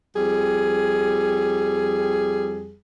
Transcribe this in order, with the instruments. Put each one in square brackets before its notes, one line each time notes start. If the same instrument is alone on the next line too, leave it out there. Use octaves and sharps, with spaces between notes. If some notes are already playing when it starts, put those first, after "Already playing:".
[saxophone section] F2 G3 G#4